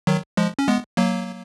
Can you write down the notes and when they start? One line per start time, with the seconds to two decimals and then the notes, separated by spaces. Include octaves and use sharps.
0.07 D#3 F#3
0.37 F3 G#3
0.59 C#4
0.67 G#3 B3
0.97 F#3 A#3